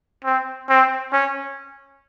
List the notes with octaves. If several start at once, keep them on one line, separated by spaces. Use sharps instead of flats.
C4
C4
C#4